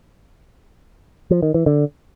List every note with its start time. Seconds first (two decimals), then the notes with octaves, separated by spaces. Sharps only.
1.31 F3
1.42 D#3
1.54 E3
1.66 D3